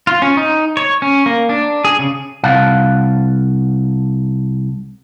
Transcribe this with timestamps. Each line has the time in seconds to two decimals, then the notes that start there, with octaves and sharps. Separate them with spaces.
0.07 F4
0.22 C#4
0.37 D#4
0.77 C#5
1.02 C#4
1.26 A#3
1.49 D4
1.85 G#4
1.99 C#3
2.44 C2 F5 F#5 A5